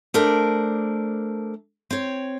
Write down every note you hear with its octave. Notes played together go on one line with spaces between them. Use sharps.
A3 D4 A#4 C5 D5
C4 C#5